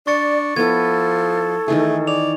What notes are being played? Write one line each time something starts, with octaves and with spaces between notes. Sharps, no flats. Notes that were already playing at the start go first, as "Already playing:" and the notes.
D4 D5 C#6 A6 C#7
F3 B3 E4 A4 G#6
D#3 E3 A3 G#4
D5 F7